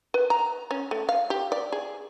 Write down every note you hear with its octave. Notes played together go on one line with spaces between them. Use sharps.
B4
A#5
C#4
A3
F5
G4
D5
G#4